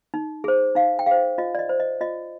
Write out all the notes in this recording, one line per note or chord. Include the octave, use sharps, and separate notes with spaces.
D#4
G#4 C5
D#4 F5
G5
G#4 C5 F5
F4 D#5
D5
D#5
C5
D#5
F4 D#5